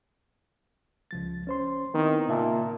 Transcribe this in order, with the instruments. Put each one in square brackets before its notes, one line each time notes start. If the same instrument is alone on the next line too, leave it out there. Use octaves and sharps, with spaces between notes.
[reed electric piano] C#2 F3 A6
C#4 C5 C6
[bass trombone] D#3 [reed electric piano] B3 C4 E4
[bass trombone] A#2 [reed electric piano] C#3 E5 A5